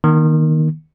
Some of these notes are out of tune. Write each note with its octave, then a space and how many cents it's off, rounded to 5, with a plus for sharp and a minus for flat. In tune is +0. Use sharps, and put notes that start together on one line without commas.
D#3 +0 A#3 +40